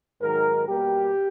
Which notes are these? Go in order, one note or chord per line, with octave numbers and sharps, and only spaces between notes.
G#2 D#3 F#3 A#4
B2 G3 A#3 G4